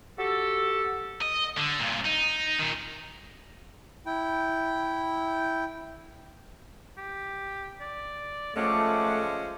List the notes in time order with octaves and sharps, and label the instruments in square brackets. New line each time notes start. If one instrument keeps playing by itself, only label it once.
[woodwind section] F#4 G4 A4
[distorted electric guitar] D#5
D3
G2 A#2
D#4
A#2 D#3
[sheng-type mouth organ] E4 G5
[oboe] G4
D5
[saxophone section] F3 G#3 C#4 [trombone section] A3 [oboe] F#5 [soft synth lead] D6